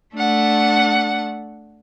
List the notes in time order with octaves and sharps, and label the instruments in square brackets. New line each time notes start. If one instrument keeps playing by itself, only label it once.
[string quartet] A3 D4 F#5